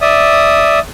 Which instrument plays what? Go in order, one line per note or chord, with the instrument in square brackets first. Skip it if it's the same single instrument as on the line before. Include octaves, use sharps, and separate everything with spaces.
[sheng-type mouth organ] D5 E5 D#6